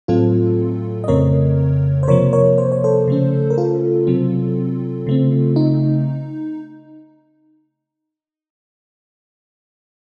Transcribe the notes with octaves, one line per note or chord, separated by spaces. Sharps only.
A2 F#3 A3 C4 F4 A4
D#5
F2 C#3 A3 C4 A#4 C#5
C5
C3 F3 A#3 A#4 C#5
A#4 C#5
C5
C#5
A4 C5
C#3 A3 C#4
A#4
F4 A4
C3 F#3 C4
C#3 A3 C4
D#4